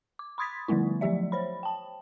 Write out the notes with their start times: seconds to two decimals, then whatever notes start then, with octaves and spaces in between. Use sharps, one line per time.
0.19 D6
0.38 B5 C6 D#6 G#6 A6 B6
0.68 D3 F3 G3 A3 B3 E4
1.01 F3 F#3 A3 G4 D5 E5
1.32 C5 C#5 B5
1.63 G5 A5